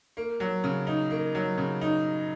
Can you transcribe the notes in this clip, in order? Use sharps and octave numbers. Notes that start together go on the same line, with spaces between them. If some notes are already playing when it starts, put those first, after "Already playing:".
A#3
F#3
C#3
D#4
A#3
F#3
C#3
D#4